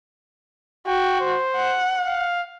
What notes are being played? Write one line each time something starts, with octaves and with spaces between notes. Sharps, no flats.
F#4 G5
C5
F#5
F5